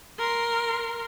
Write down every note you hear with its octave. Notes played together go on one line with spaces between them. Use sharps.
A#4 C6